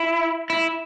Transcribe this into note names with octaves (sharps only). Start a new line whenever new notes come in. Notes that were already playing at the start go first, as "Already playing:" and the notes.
Already playing: E4
E4